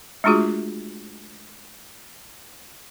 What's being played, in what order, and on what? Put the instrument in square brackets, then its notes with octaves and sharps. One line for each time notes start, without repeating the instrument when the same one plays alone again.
[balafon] G#3 A3 D4 F4 F#4 G#4